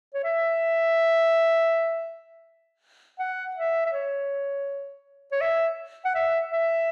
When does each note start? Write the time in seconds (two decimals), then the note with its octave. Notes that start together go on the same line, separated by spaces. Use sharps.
0.14 C#5
0.24 E5
3.19 F#5
3.57 E5
3.86 E5
3.93 C#5
5.32 C#5
5.41 E5
6.05 F#5
6.15 E5
6.52 E5